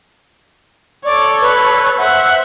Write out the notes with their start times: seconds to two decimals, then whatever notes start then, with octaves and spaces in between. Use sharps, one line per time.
1.05 A4 C#5 D5
1.41 B4
1.98 C5 E5 F#5